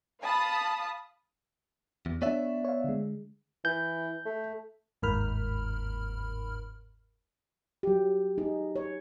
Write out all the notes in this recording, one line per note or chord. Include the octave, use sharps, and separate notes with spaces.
F5 A5 B5 D#6
E2
B3 D4 C#5 D5 E5
C#5 F5
D3 G#3
E3 G6
A3
G1 D#2 G#2 A#4 B5 F6
F#3 G4
D#4 G#4
C#5